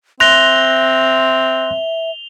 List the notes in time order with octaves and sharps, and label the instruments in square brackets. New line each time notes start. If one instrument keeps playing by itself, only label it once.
[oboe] C4 [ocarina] E5 [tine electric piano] C6 F#6 A#6 [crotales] F7 G7